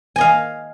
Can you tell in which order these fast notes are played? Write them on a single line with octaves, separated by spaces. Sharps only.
G#5 D#5 F5